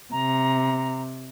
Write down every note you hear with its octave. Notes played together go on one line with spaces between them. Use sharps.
C3 A#5